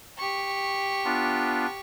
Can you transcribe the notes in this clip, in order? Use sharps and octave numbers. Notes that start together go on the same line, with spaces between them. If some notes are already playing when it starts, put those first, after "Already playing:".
G4 C#6
B3 D4 F4